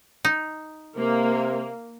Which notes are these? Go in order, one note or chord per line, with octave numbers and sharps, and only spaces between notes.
D#4
C3 A#3